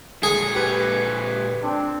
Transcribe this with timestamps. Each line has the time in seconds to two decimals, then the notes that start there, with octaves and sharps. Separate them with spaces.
0.23 A#2 G#4 A4
0.55 G4 B4 G#6
1.63 C4 D4